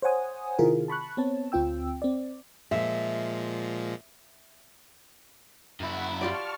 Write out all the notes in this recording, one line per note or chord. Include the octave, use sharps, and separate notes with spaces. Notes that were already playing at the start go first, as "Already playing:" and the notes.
C5 C#5 F#5 G#5 D#6
C3 D#3 E4 F4 G#4 A#4
A5 B5 C#6 F#6
B3 C4 C#5 A5
D2 C4 F4 G5 E6
C4 D5
A#2 F3 G#3 E5
F#2 E4 F#5 B5
F4 G4 D5 A5 C#6 F6